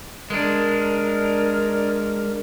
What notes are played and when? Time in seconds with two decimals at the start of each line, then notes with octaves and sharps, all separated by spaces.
0.30 G#3 D4 A#4